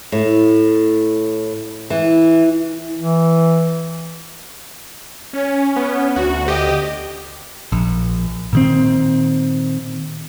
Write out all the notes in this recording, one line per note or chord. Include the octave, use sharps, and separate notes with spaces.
A2
E3
E3
C#4
B3
D2 F#4
G4 D#5
A#1
A#2 D#3 C4